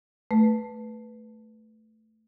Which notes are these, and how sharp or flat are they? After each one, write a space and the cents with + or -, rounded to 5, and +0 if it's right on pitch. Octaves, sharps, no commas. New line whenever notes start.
A3 +0 B4 +0